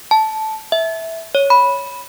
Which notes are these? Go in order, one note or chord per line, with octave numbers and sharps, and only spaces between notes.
A5
E5
C#5
B5